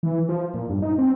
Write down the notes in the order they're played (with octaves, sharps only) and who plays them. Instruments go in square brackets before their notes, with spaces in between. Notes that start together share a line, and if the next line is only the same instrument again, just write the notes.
[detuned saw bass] E3
F3
A#2
G2
D#4
C4